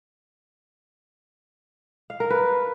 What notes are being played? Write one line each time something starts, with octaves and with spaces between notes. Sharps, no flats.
F5
A#4
B4